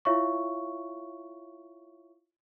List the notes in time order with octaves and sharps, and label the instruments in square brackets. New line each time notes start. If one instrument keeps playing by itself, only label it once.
[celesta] E4 F4 C#5 E5 F5 C#6